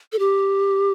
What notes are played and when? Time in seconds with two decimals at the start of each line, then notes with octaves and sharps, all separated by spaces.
0.12 A4
0.19 G4